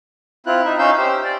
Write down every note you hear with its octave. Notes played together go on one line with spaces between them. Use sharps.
C4 E4 F4 F#6
D#4 E5
C#4 D#4 F5 E6 G6
G4 C5 E6
D5